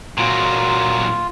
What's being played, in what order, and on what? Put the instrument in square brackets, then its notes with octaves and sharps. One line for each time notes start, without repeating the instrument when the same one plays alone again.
[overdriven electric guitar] A#2 F#3 [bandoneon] F4